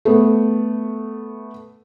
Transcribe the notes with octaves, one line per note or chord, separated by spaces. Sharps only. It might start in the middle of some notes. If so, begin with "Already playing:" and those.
A3 B3